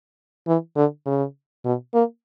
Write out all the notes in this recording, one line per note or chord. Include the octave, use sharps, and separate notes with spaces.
E3
D3
C#3
B2
A#3